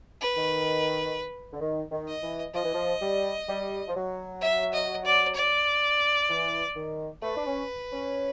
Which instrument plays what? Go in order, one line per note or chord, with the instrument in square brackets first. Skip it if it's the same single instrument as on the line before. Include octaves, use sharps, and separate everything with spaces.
[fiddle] B4
[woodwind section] D#3
D3
D#3
D#3
[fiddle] D#5
[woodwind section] E3
[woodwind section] F3 [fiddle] D#5
[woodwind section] E3
F3
G3
G3
F3
F#3
[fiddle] E5
D#5
D5
D5
[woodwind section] E3
D#3
[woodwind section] A3 [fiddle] B4
[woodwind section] D4
C#4
C#4